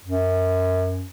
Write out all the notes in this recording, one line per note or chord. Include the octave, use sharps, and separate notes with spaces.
F#2